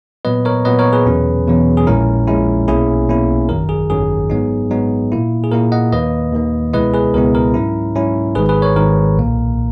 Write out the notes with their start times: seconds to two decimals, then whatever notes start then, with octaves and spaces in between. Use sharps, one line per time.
0.25 A#2 F#3 B3 B4 D#5
0.45 A#4 C#5
0.65 A#2 F#3 B3 B4 D#5
0.79 A#4 C#5
0.93 G#4 B4
1.06 E2 B2 F#3 C#4
1.47 E2 B2 F#3 C#4
1.77 G#4
1.87 A#1 A#2 G#3 C#4 E4 A#4
2.27 A#1 A#2 G#3 C#4 E4
2.68 B1 B2 A#3 C#4 E4 G#4
3.08 B1 B2 A#3 C#4 E4
3.49 G#1 F#2 D#3 F#3 A#4
3.69 G#4
3.90 G#1 F#2 D#3 F#3 G#4
4.30 G#2 F#3 B3 D#4
4.71 G#2 F#3 B3 D#4
5.12 A#2 A#3 E4
5.44 G#4
5.52 A#2 A#3 E4 A#4
5.72 D#5 F#5
5.92 D#2 D#3 A#3 B4 D#5
6.33 D#2 D#3 A#3
6.73 C#2 B2 G#3 B3 E4 B4 D#5
6.94 G#4 B4
7.14 C#2 B2 G#3 B3 E4 A#4
7.35 A#4
7.54 G#2 F#3 C#4 E4
7.95 G#2 F#3 C#4 E4
8.35 G#1 G#2 D#3 G#4 B4
8.49 G#4 B4
8.62 A#4 C#5
8.76 G#1 G#2 D#3 A#4
9.17 B1 A#2 A#3